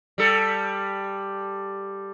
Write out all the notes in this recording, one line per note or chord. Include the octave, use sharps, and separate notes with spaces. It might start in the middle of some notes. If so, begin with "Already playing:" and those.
G3 A4